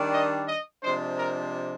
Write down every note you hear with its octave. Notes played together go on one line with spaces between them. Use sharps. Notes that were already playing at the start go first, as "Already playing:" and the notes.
Already playing: D#3 G3 D4
D#5
D#5
C3 F3 G#3 D4 C5
A#4